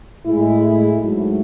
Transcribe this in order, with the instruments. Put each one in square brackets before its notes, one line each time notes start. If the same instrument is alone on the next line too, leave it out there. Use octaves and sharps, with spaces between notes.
[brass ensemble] A2 G#3 E4
G#2 F#3 A3